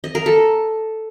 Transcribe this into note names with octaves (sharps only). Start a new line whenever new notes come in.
D#5
A#4
A4